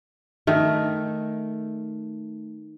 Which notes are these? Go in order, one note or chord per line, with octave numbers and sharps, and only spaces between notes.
D#3 A3